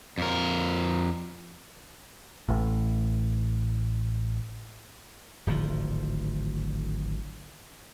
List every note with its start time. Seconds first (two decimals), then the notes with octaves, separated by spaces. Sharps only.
0.18 F2 A#4
2.49 A1 A2
5.47 D1 G#1 D2 F3